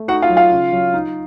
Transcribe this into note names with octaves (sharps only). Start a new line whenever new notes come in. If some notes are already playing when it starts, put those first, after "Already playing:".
Already playing: A3
D#4 F#4 F#5
F4 F5
F#3
F4 F5
C#3
F#3
D#4